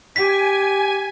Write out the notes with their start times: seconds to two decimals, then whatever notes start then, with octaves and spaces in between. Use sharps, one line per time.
0.16 G4 G#5 B6